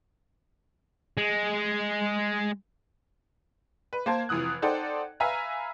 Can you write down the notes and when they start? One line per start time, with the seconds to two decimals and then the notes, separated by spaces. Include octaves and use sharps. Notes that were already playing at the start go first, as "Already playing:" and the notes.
1.17 G#3
3.93 B4
4.06 A#3 C5 A5 G#6
4.29 F1 E3 D#6 F#6
4.62 D#4 A4 C5 D5 F#5 G5
5.20 B4 E5 F5 G#5 A#5